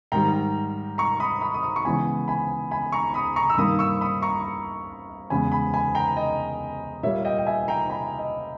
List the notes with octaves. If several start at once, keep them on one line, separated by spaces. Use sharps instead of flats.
G#2 D#3 G3 G5 A#5
A#5 C#6
B5 D#6
B5 D#6
D#6
A#5 C#6
C#6
C#3 E3 G#3 B3 G#5 B5
G#5 B5
G#5 B5
A#5 C#6
B5 D#6
A#5 C#6
E6
G2 D#3 A#3 B5 D#6
C#6 E6
B5 D#6
A#5 C#6
E2 C#3 G#3 B3 G#5 B5
G#5 B5
G#5 B5
G5 A#5
D#5
A#2 G3 A#3 C#5 E5
D#5 G5
G5
E5 G#5
G5 A#5
G#5 B5
D#5